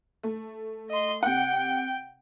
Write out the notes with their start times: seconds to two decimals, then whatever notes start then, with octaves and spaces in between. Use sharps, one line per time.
0.23 A3
0.90 D#5 C6
1.23 C3 F#5 G5